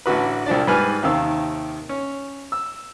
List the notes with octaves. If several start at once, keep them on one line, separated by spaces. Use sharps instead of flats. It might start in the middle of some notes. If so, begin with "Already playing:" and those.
A1 D3 F#4 B4
C2 F3 D4 D5
G#2 G3 B4 G#5 F6
D#2 C3 D#3 F5 E6
C#4
E6